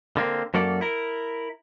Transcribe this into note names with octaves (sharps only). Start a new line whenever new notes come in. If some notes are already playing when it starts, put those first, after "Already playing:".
D3 A#3 C4
F#2 F#3 A#3 A4 D5
E4 A#4